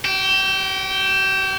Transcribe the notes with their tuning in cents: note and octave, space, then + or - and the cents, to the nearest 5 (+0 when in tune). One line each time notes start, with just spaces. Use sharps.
G4 -45 G5 +0